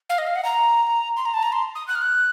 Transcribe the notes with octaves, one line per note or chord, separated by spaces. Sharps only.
F5
D#5
F5
F#5
A#5
C6
A#5
A5
A#5
C6
D#6
F#6
F6
F#6